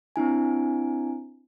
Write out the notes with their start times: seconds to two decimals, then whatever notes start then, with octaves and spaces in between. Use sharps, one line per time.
0.16 C4 D4 E4 G#5